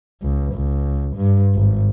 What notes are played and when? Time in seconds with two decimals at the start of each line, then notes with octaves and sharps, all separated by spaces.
0.22 C#2
0.54 C#2
1.16 G2
1.55 G#1